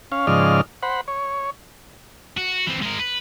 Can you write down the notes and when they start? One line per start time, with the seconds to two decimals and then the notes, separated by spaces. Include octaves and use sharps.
0.12 C#4 F5
0.27 G#2 C#3 F3 D5 D#5 F6
0.83 C5 F#5 B5
1.08 C#5
2.38 F#4
2.67 E3 C4
2.83 G#3 A#4
2.99 B4